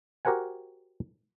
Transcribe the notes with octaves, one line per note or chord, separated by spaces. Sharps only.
F#4 G4 A#4 C5 F#5 G#5